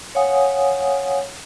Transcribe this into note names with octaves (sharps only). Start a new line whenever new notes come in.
C#5 F5 F#5 G#5 D#6